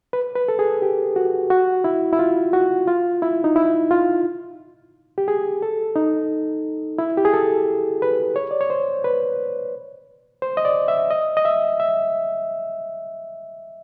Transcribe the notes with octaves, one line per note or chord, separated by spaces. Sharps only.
B4
B4
A4
G#4
G4
F#4
F#4
E4
E4
F4
F#4
F4
E4
D#4
E4
F4
G4
G#4
A4
D#4
E4
G4
G#4
A4
B4
C#5
D5
C#5
C5
B4
C5
D#5
D5
E5
D#5
D#5
E5
E5